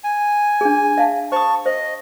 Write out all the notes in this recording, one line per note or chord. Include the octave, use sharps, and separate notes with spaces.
G#5
D4 G#4
E5 F5 A5
C5 A5 C#6 D#6
C5 D#5